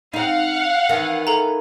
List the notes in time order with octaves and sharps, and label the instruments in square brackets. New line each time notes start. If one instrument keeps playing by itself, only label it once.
[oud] C4 D#4 [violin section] F5 F#5
[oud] D#3 E3
[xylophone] A4 A#5